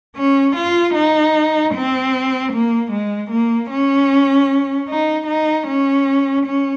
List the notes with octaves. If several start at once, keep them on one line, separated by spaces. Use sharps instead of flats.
C#4
F4
D#4
C4
A#3
G#3
A#3
C#4
D#4
D#4
C#4
C#4